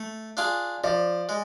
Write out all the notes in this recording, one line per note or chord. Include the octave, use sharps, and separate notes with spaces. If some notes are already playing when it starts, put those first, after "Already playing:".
Already playing: A3
D4 F4 G#4
F3 D5
G#3